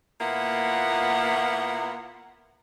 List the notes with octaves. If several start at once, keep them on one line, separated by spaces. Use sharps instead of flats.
A#2 A#3 B3 E4 F4 F#5